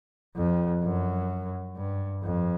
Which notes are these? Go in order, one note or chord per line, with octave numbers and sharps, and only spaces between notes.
F2
F#2
G2
F2